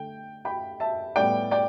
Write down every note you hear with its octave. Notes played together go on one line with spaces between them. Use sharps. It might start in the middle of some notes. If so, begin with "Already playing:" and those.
Already playing: D3 A3 G5
G5 B5
E5 A5
A2 G3 B3 D5 G5
D5 G5